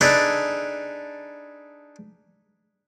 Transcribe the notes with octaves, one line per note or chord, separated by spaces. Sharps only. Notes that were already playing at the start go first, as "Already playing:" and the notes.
D4 D#4 G#4 A4 B4 D5